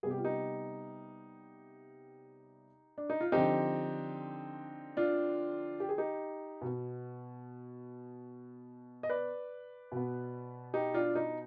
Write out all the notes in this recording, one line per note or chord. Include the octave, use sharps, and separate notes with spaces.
C3 G3 B3 G#4
G4
F4
D#4 G4
D4
D#4
F4
D3 F3 C4 D#4 G4
D4 F4
G4
G#4
D#4 G4
B2 B3
D#5
B4 D5
B2 B3
D#4 G4
D4 F4
D#4